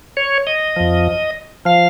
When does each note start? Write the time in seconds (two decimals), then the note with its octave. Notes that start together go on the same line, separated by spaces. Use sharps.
0.17 C#5
0.47 D#5
0.76 F2 F3
1.65 F3 F5